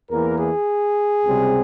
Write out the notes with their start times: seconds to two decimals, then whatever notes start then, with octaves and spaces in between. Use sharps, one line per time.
0.11 E2 E3 A#3 A#4
0.38 G#4
1.25 C#2 C3 G3 C4